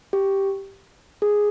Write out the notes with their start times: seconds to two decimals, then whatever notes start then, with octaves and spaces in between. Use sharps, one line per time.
0.13 G4
1.22 G#4